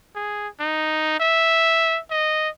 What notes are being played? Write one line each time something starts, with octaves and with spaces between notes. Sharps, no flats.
G#4
D#4
E5
D#5